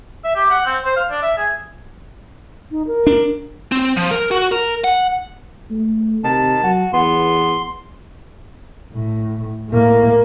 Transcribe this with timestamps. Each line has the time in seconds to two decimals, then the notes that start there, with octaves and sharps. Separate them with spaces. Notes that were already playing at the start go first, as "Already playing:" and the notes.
0.24 E5
0.36 G4
0.50 F#5
0.66 C4
0.85 C5
0.97 F5
1.11 D4
1.22 E5
1.37 G#4
2.71 D#4
2.87 A#4
3.07 D4
3.72 C4
3.97 F3
4.11 A#4
4.31 F#4
4.52 A#4
4.84 F#5
5.71 A3
6.24 C3 D#3 A5
6.64 F#3 F#4
6.93 E2 B3 C6
8.94 A2
9.69 A2 A#3